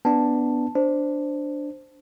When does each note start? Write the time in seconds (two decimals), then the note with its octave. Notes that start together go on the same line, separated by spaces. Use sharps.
0.05 B3 D4 A5
0.75 D4 C5